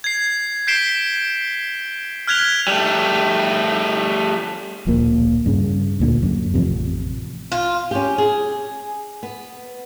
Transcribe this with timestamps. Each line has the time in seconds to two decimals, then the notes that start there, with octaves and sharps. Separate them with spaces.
0.04 G#6 C7
0.67 G6 B6 C7 D7 E7 G7
2.27 F6 F#6 G#6 B6 F7 G7
2.68 G3 A3
4.87 D1 A#1 A#2 A#3
5.46 G2 C#3
6.00 D2 A#2 D3
6.22 F#2
6.54 A1 F2 C3
7.52 F4
7.91 C#4 G4
8.18 G#4
9.23 B3